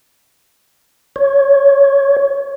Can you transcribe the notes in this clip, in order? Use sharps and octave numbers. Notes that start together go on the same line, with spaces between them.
C#5